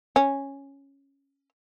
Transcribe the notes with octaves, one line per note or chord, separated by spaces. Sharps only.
C#4